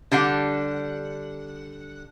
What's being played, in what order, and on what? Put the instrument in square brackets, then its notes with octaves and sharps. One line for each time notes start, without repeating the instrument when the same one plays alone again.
[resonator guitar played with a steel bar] D3 G3 D4 F#5